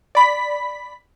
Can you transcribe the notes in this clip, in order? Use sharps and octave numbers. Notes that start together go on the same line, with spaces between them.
D5 B5 B6